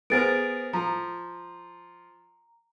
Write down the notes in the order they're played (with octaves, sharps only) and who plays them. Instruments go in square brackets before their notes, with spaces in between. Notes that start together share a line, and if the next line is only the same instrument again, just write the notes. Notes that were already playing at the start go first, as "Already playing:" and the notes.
[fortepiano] B3 G#4 A#4 [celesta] C5 A6 D7
[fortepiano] F3 [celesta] A#5